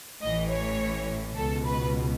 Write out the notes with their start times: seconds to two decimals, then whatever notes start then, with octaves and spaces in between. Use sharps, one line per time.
0.21 A1 A2 E3 D#5
0.50 C#5
1.36 C#2 B2 A4
1.65 B4